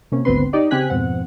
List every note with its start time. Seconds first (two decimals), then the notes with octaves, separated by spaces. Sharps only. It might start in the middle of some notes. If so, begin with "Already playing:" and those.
0.12 C3 A#3 C#4
0.25 G#1 D2 B3 C4 B4 C6
0.53 D#4 G4 D5 D#5
0.71 C#3 C4 G4 G#5 F#6 B6
0.90 F2 G#2 B2 C4 F#5